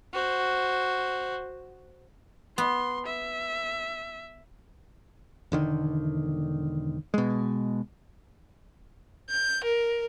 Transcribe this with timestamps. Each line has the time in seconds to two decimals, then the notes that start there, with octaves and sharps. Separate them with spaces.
0.13 F#4 C5
2.58 B3 C6
3.06 E5
5.52 E1 D3 D#3
7.14 B2 G#3
9.30 G6
9.64 A#4